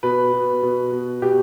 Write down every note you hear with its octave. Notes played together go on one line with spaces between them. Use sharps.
B2 B4
B2
B2
B2
B2 G4